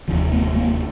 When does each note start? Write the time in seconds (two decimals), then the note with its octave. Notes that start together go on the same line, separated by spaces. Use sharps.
0.08 F1 D#2 D3 F3
0.32 A3 B3
0.55 A#3 C4